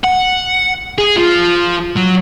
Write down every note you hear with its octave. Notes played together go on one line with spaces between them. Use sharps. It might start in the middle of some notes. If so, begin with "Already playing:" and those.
F#5
G#4
F3
F#3